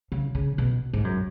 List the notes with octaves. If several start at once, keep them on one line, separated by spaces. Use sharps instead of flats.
C#3
C#3
B2
G#2
F#2